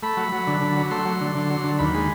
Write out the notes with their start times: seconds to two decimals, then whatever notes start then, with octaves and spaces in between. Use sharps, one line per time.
0.03 A3 B5
0.17 F#3
0.32 F#3
0.47 D3
0.61 D3
0.76 F#3
0.91 A3 C6
1.05 F#3
1.21 D3
1.35 D3
1.50 F#3
1.64 D3
1.79 D#2 B5
1.94 G#3